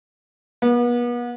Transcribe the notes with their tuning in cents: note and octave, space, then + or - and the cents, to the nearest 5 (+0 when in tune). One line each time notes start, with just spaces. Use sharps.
B3 -35